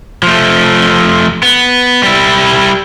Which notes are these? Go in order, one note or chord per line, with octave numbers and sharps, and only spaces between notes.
F3 A3
B3
G3 E4